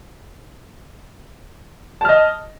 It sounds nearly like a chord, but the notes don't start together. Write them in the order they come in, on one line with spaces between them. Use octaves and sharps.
A5 F6 D#5